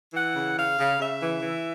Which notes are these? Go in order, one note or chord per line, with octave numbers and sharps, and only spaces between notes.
E3 F#5
C#3
C#3 F5
C#3
C#3 E5
E3
E3